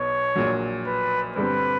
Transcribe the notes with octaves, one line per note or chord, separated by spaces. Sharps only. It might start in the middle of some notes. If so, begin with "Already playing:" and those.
Already playing: B1 B2 B3 C#5
A#1 A#2 F#3
B4
G2 D3 G3 C4 B4